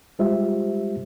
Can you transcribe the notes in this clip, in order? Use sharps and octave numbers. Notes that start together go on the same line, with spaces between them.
G3 G#3 F4 G4 C5 E5